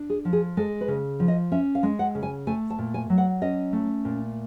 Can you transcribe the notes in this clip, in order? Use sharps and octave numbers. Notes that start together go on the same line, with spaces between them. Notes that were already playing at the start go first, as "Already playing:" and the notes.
Already playing: D4
G#4
F3
G#4
G#3 A4
B4
C#3
F3
D#5
C#4 E5
F5
G#3
F#5
C#3
G#5
A3 G#5
A5
A#2
G#5
F#3
F#5
C#4 D#5
A3
A#2